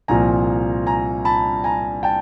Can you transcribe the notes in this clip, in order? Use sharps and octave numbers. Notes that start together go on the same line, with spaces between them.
C2 A#2 F3 G#5 A#5
G#5 A#5
A5 B5
G#5 A#5
G5 A5